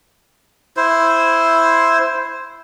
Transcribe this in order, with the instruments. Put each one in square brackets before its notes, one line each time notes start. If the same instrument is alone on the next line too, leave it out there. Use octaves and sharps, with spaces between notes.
[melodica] E4 C5